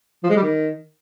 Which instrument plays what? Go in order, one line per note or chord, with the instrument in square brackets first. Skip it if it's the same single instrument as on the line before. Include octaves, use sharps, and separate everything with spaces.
[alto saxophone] F3
G#3
G3
D#3